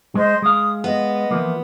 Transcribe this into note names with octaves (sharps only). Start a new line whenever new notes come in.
G#3 C5 D#5
G#3 F5 D#6
B3 D#5
E3 F3 A#3